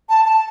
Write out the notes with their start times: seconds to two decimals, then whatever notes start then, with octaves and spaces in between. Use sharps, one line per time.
0.09 A5
0.25 A5